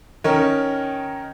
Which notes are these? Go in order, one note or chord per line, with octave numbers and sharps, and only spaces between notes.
D#3 C#4 A#4 C#5